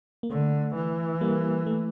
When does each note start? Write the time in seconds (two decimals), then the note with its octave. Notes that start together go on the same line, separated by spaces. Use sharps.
0.23 A#3
0.30 D3 A3
0.75 E3
1.21 G3 A#3
1.66 A3